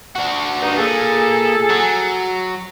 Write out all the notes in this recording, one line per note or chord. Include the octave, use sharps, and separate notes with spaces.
D4 F#4
G2 D#4
A#2 G#4 A4
F#3